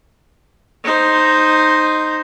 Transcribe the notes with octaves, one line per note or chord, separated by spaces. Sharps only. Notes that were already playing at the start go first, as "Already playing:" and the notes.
D#4 C5